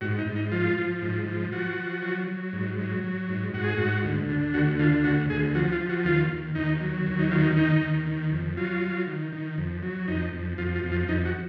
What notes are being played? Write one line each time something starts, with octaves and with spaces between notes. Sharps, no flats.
G#2 F#4
D#4
G#2
D#4
F3 F4
F3
G#2
F3
F3 F#4
F3
F#3
F#3
G#2
F#3
F#3
G#2
G#2 F#4
G#4
G#2 F#4
D2
D3
D2 F#4
D3 F4
D2 F#4
D2 G#4
F3 F#4
F4
F3
F#4
D#2 F4
D#2
D#2 D#4
F#3
D#2
D#4
D#3 F4
D#4
D#3 D#4
D#2
D#3
F2
F#3 F4
F#3
D#3
D#3
F2
F#3
F2 D#4
F2
F2 F4
F4
F2
F4
F2 D#4
F#4